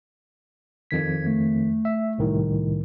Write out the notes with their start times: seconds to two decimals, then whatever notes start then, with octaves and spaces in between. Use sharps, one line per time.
0.91 F2 D#3 G#6 B6
1.27 A3
1.85 E5
2.18 C2 A2 D#3